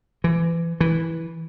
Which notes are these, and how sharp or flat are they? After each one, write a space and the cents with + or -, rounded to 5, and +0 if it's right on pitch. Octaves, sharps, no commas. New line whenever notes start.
E3 +25
E3 -10